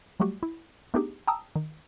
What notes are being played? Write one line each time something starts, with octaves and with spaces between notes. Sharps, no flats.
F#3 G3 A3 F#4 G4
E4
A3 B3 D4 D#4 G4 G#4
G5 A5 A#5 D#6 E6
D#3